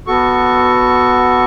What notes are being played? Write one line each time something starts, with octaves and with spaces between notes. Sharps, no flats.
B3 F#4 A4 C#6